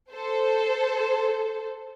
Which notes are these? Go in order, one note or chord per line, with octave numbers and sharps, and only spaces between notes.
A4 C5